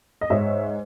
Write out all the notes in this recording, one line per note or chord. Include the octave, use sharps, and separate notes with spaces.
D#5
G#2 C#5 E5